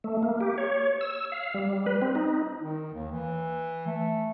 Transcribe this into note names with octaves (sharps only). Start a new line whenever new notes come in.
A3
A#3
G4
C#5
E6
F5
G3
B4
C4
D#4
D#3
D#2
E3
A3